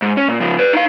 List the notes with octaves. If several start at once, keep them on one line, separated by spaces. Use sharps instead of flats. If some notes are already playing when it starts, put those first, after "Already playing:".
G#2
C#4
A#2
C#3 F3
B4 D5
D#4 F5